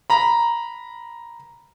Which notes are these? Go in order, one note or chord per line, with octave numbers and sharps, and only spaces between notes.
A#5 B5